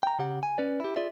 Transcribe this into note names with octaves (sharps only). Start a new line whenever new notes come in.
G5 A#5
C#3 G4 F#5
G#5
C#4 B4 D5
E4 G4
F4 G#4 D5 E5